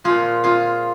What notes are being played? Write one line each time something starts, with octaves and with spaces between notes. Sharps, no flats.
A#2 F3 F4 G#4
F4 G#4